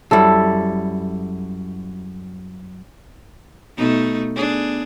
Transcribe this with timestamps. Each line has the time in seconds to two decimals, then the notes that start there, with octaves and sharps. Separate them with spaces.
0.11 F#2 G3 E4 A4
3.76 B2 A3 D#4
4.35 B3 D4 G#4